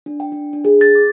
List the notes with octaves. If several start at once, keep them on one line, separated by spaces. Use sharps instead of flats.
D4
G5
D4
D4
G#4
A6
D6